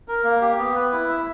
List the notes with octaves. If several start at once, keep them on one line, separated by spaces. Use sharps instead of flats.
A#4
A#3
G4
B3
B4
E4
E5